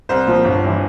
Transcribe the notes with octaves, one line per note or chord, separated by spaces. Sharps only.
C2 C5
A#2 F3
G1
G2 E3